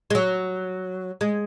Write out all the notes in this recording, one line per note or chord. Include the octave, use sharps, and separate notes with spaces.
G#3
F#3
G#3